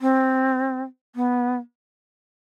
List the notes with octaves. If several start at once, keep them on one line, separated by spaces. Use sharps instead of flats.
C4
B3